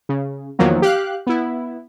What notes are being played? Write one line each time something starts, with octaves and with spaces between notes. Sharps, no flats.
C#3
E2 D#3 F3 F#3 A#3
G4 F5 F#6
B3 E4